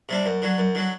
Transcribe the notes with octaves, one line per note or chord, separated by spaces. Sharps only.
C3 G3 D4
F#2
D3 F#3
F#2
D3 F#3